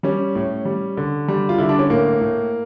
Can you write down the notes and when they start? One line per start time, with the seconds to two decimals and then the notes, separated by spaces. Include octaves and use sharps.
0.03 G3 C#4
0.35 A2
0.65 G3
0.97 D3
1.28 G3
1.49 F4
1.58 D3 E4
1.69 D4
1.79 C#4
1.90 A2 A#3
2.21 A2